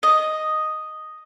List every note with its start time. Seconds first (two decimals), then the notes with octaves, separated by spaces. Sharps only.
0.03 D#5